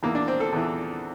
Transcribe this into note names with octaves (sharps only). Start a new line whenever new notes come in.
E2 E3 A#3
D4
C4
A4
E2 E3